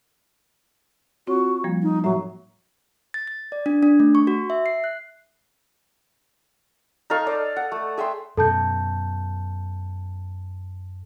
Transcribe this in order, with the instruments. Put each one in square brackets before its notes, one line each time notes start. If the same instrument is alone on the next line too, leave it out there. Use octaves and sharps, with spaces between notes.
[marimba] C4 F4 C#5 [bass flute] F#4
[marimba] F3 G3 A#3
[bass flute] D#4
[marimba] A2 E5 A#5 [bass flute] F#3
[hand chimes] A6
A6
D5
D4
D4
A3
C#6
F#4
E5
C7
F#6
[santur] D#4 A4 F5 C#6
A4 D5 D#5
F#5
A3
G#4 E5 G5 C6
[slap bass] F#2 B2 [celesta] A4 A5 G6